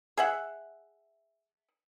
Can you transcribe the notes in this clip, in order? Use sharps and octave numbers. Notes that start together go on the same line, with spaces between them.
G#4 E5 F#5